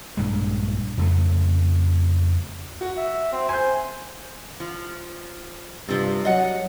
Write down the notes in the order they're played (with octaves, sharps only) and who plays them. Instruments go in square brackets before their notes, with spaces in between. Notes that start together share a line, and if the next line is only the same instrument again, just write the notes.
[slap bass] A#1 G2 G#3
F2 C#3 A3
[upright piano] F#4
[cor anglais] E5
C4
[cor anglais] C5 [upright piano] G#5 G6
[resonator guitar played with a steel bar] F3
[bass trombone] G2 [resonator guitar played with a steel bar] C3 F3
[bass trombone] F#3 [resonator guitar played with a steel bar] D#5 F#5